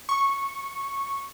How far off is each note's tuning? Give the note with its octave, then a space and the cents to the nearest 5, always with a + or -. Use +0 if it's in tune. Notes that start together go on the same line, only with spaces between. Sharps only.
C#6 -5